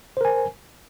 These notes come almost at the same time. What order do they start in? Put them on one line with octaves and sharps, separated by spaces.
C5 A#4 G#5